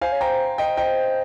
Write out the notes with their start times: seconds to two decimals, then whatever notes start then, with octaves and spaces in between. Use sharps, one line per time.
0.01 C5 F5 G#5
0.12 C#5
0.21 C5 G5 A#5
0.58 D#5 G5
0.77 D#5 G5